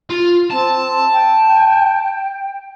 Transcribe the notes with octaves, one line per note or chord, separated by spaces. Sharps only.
F4
C4 A5
G5